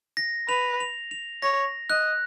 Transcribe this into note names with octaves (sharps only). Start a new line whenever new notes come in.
A#6
B4 F7
F7
F7
C#5 A#6
D#5 F#6